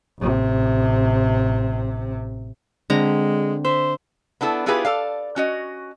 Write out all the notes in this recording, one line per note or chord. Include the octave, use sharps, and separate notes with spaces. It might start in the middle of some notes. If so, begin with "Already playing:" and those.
A1 C3
D3 G#3 C4 A#5
C5 E5
B3 D4 E4 A4
B3 E4 F4 G4 G#4 B4
A4 D5 F5
C#4 F#4 D#5